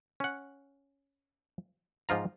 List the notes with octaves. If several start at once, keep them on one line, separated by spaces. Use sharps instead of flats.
C#4 F#5
G#2 F3 F4 A#5